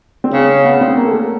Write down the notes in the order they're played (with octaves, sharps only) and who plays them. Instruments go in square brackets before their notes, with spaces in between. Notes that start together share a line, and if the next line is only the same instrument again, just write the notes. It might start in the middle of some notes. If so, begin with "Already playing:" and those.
[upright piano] C4
[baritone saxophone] C#3 [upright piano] C#4
[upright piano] B3
C4
A#3
A3
A#3